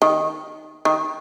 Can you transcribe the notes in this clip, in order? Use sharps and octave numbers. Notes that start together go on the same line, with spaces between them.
D#3
D#3